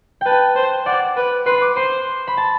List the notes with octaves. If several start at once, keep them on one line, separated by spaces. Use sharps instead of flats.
B4 G5 A5
C5
D5 F#5
B4
B4 C6
C6 D6
C5 C6
B5
A5